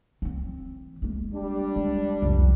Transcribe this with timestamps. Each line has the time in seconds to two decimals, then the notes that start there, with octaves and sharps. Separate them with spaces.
0.22 E3 C4
1.02 G#3 A#3
1.34 G3 D4
1.76 G#3
2.22 C2 F2